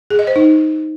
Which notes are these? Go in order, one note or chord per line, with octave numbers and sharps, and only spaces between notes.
G#4
D#5
C5
D#4